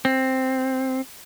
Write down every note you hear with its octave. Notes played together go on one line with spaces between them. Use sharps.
C4